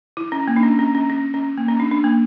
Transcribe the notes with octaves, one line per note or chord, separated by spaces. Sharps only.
E4
C#4
A#3
D4
C#4
C#4
C#4
C#4
C#4
A#3
C#4
D4
D4
A#3